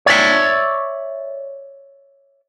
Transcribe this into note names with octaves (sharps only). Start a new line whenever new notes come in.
C#5 D5 E5